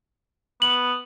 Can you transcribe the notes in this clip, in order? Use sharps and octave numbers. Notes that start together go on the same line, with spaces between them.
B3 F#7